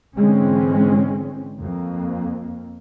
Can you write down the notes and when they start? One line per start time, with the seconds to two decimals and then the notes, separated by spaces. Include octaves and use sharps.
0.17 G#2 D3 E3 G#3 C4 C#4
1.60 F2 A#3